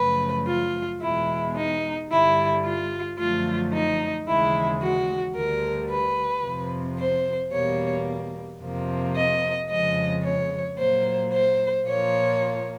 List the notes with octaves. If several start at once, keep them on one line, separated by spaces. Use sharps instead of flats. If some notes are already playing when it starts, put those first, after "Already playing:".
Already playing: F#2 C#3 F3 A3 B4
F4
E2 B2 G#3 E4
D#4
G2 D3 G3 E4
F4
F#2 D3 F3 A3 F4
D#4
D#2 C#3 E3 G#3 E4
F#4
D2 D3 G3 A#4
B4
F2 C3 F3
C5
E2 B2 G3 A#3 C#5
F2 C3 F3 A#3
D#5
F2 C#3 F3 G#3 D#5
C#5
A#2 F#3 A#3 C5
C5
A#2 F3 A#3 C#5